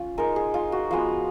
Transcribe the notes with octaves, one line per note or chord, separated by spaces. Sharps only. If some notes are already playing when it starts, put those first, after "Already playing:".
Already playing: C#4 F4
G#3 D#4 A#4
G#4
F4
F#4
F3 G#3 B3